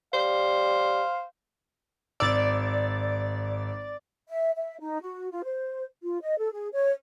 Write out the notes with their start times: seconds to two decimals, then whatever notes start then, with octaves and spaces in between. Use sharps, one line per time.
0.14 G3 C5 F5
2.20 G#1 D5 E6 A6
4.29 E5
4.57 E5
4.80 D#4
5.02 F#4
5.31 F4
5.43 C5
6.03 F4
6.22 D#5
6.38 A4
6.52 G#4
6.73 C#5